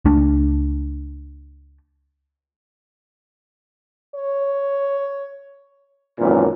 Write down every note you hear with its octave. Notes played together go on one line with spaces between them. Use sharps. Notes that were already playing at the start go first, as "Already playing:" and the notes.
C#2 A3 D4
C#5
G#1 F#2 A#2 E3